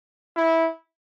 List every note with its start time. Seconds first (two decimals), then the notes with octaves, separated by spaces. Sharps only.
0.37 E4